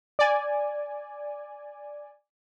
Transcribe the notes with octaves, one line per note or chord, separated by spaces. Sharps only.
D5 G#5